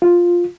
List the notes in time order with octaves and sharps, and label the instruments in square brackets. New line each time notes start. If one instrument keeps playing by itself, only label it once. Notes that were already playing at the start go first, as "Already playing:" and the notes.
[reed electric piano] F4